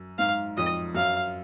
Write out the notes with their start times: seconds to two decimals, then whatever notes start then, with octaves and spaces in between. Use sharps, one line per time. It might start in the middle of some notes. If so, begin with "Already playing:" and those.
Already playing: F#2
0.19 G#2 F5
0.57 F2 D#5
0.95 F#2 F5